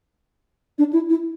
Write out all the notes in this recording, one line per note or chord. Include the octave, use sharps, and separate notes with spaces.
D4
E4
E4